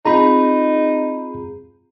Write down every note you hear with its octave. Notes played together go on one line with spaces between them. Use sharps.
C4 D#4 F4 G#4 A#5 B5